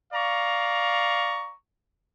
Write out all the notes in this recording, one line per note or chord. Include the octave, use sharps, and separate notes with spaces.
D5 F5 A#5 C#6